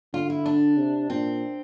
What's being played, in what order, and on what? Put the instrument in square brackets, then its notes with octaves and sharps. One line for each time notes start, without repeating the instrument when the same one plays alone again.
[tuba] D3 [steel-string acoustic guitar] F4
[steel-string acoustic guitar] E4
D4
[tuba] C3
[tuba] A#2 [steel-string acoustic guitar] C4